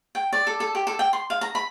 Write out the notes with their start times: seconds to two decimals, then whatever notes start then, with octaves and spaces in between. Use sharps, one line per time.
0.15 G5
0.33 D5
0.47 A4
0.60 A4
0.75 G4
0.87 A4
0.99 G5
1.13 C6
1.30 F5
1.41 A#5
1.55 B5